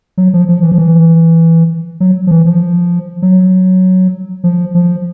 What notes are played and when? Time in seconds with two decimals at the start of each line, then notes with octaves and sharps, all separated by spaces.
0.18 F#3
0.33 F3
0.49 F3
0.63 E3
0.72 F3
0.78 E3
2.00 F#3
2.27 F3
2.31 E3
2.46 F3
3.22 F#3
4.44 F3
4.75 F3